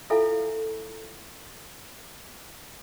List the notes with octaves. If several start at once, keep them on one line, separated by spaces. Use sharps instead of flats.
E4 F4 A4 E5 F5 G#5